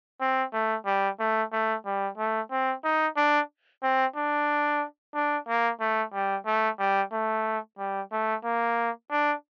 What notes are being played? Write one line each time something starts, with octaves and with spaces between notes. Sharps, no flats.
C4
A3
G3
A3
A3
G3
A3
C4
D#4
D4
C4
D4
D4
A#3
A3
G3
A3
G3
A3
G3
A3
A#3
D4